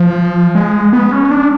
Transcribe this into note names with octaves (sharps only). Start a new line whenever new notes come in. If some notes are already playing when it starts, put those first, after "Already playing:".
Already playing: F3
G#3
B3
C#4
D4